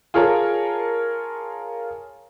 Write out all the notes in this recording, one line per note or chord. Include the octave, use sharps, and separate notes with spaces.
F4 G#4 A#4 C#5 A5 A#5